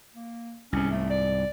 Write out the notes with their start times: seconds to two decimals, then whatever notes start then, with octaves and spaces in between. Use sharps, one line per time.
0.15 A#3
0.73 C2 G#2 C#4
0.91 A3
1.10 D5